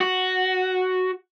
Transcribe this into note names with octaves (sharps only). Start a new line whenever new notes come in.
F#4